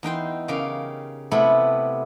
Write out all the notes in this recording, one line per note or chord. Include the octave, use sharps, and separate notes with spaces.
E2 D#4 G5 C6
C#3 G4 A#4 F5
C3 A3 B3 E4 B5